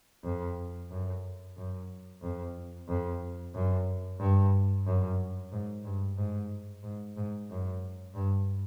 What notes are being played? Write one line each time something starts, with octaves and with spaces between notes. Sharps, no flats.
F2
F#2
F#2
F2
F2
F#2
G2
F#2
G#2
G2
G#2
G#2
G#2
F#2
G2